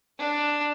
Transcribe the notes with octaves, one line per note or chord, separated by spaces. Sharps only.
D4